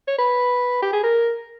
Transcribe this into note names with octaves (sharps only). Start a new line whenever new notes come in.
C#5
B4
G4
G#4
A#4